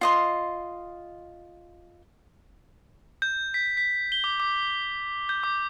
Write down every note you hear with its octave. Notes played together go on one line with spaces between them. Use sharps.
F4 D#5 C6
G6
B6
B6
G7
D6
D6
G6
D6